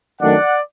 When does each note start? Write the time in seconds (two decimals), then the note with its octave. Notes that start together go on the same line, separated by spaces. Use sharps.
0.20 F#2 D#3 A3 D4 D5 F#5